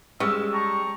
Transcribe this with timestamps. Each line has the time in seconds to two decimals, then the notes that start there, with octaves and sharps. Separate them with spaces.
0.20 C#3 G3 G#3 E6
0.53 G5 A5 A#5 C#6